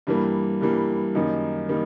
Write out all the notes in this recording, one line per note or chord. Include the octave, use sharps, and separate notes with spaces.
G2 E3 G3 A#3
G2 E3 G3 A#3
F#2 D#3 G3 A#3 D#4
D#3 G3 A#3 D#4